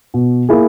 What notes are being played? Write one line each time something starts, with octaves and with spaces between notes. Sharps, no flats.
B2
A#3 E4 G#4